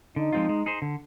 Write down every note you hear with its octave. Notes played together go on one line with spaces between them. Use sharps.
D3 D#4
F3 G#3 C4 F4
G#3
D#4 G#4 C5
D3